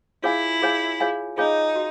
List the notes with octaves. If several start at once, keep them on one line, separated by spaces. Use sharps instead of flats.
E4 F4 G#4 C#5 F5 G#5
F4 G#4 C#5 F5 G#5
F4 G#4 C#5 F5 G#5
D#4 F4 G#4 C#5 F5 G#5
F#4